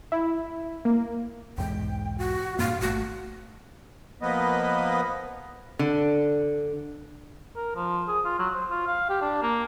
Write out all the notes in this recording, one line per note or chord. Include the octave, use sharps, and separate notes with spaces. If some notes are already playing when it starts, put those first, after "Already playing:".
E4
A#3
B1 E2 G#2 G5
F#4
G2 A#2 A#3 F5
G#1 A3 F#4
F3 A#3 B3 B4 D#5
D3
A#4
F3
G#4
F4
F#3
C5
F4
F5
G4
D4
A#3